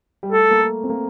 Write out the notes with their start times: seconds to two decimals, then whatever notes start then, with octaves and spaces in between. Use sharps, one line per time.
0.23 G3
0.32 A3 A4
0.51 A#3
0.61 A3
0.84 C4
0.90 A#3